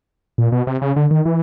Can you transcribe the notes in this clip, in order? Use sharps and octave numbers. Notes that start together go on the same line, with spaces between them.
A#2
B2
C3
C#3
D3
D#3
E3